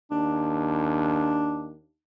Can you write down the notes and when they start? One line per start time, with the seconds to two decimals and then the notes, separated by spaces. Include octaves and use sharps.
0.11 D#2 D4